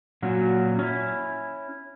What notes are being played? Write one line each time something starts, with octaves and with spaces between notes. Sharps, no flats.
A#2 F#3 C#4 F#4
C#4 E4